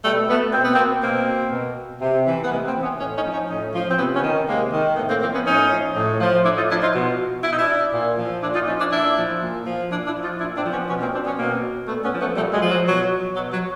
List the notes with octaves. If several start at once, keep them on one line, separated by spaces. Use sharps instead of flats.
B2 G3 A3
A3 B3
B2 C4
B3
A#3 C4
B2 A#3 C4
B2
C3
E3
B3
C3 G#3 A#3
A#3 C4
E3
B3 C#4
A2 C#4 D#4
C#4 D#4
F3
C#4 D#4
A2 C#4 D#4
F3
C4
C3 B3 C#4
B3 C#4
D#3
C3 G#3 A#3
D#3
A2 A3 B3
A#3 C4
F3 A#3 C4
B3 C#4
A2 C#4 D#4
F3
A2
F3
A2 D4 E4
D#4 F4
F3 D4 E4
D#4 F4
B2
B2 E4
D#4
D4 E4
A#2
F3
A#2 D4 E4
D#4 F4
F3 C#4 D#4
D4 E4
A#2 D4 E4
F3
A#2
F3
A#2 D4 E4
D4 E4
F3
D#4 F4
A#2 D4 E4
C4 D4
F3
B3 C#4
B2 B3 C#4
A#3 C4
C4 D4
B3 C#4
B2 A#3 C4
A#2 A3 B3
B3 C#4
F3
A3 B3
A#2 G3 A3
F#3 G#3
F3
F#3
B2 F#3
B2 F#3
F#3